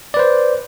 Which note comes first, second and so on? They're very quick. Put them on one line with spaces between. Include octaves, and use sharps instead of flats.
D5 B4 C5